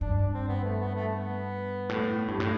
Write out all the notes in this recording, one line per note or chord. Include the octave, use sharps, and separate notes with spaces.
G2 D4
D4
C4
B3
A3
B3
A3
B3
A2
G2
A2